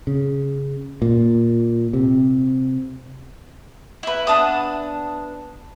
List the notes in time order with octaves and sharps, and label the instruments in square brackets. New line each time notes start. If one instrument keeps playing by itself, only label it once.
[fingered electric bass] C#3
A#2
C3
[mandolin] E4 B4
B3 D4 A5 D#6